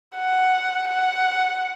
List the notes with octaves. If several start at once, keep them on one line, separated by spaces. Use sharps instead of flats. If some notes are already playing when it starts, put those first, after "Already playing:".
F#5
F#5